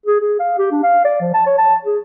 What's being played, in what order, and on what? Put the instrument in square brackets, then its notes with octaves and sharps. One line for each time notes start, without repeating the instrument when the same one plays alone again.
[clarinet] G#4
G#4
F5
G4
D4
F5
D5
F3
A5
C#5
A5
G#4